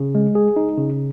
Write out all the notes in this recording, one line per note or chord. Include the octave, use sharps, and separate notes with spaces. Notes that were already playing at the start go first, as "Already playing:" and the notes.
Already playing: C#3
G#3
G#4
D#4
C#3